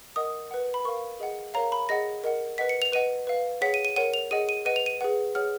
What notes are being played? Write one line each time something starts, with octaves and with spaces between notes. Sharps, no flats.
A#4 D#5 F#5 D#6
B4 F#5
B5
A#4 F5 C#6
G#4 D#5 F#5
A#4 C#5 F5 A#5
B5
G#4 D#5 F#5 A#6
A#4 D#5 F#5
B4 D#5 F#5 B6
C#7
F7
B4 D#5 F#5 D#7
B4 F5
G#4 C#5 F#5 B6
D#7
D#7
A#4 C#5 F#5 D#7
F7
G#4 D#5 F#5 D#7
D#7
B4 D#5 F#5 D#7
F7
D#7
G#4 B4 F#5
G#4 C#5 F#5 F6